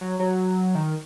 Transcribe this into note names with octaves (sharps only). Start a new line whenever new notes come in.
F#3
F#3
D#3